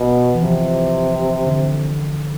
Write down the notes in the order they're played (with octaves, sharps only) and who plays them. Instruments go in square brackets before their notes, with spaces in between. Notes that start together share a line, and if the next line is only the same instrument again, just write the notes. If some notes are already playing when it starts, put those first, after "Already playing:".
Already playing: [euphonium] B2
[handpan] E3
[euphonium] C3 [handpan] F3
[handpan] D3